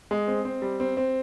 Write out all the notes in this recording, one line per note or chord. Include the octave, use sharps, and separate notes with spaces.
G#3
C4
C4
G3
C4
C4